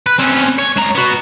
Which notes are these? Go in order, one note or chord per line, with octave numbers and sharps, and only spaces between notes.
B4
C4 C#4
C#5
C#2 A#5
B3 F#4